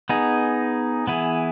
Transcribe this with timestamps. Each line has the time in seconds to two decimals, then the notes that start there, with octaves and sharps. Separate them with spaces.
0.09 B3 D#4 G#4
1.07 E3 B3 E4 G#4